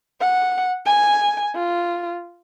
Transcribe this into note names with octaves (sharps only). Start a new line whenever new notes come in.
F#5
G#5
F4